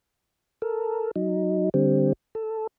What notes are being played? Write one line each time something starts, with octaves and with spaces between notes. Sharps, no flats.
A4 A#4
F#3 D#4
D3 G3 C4
A4